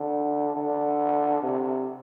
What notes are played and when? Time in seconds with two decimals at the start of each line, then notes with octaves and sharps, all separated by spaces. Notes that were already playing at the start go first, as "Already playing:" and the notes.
Already playing: D3
0.56 D3
1.42 C3